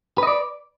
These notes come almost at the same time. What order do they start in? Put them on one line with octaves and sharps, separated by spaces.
B4 D#5 D5